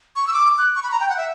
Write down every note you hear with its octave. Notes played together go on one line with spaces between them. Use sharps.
C#6
E6
D6
F#6
C#6
B5
A#5
G5
F#5
E5